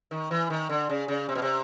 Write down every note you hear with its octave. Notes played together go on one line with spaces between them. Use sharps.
D#3
E3
D#3
D3
C#3
C#3
C3
B2
C3